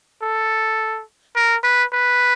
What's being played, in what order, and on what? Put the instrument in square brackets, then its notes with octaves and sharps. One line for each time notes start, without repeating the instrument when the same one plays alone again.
[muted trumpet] A4
A#4
B4
B4